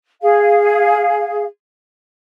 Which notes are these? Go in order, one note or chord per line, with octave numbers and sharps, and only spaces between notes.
G#4 F5